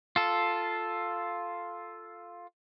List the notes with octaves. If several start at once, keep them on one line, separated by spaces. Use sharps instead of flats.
F4 A4